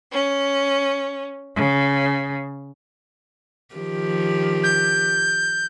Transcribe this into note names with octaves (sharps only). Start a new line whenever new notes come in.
C#4
C#3
D#3 F3 G4
G6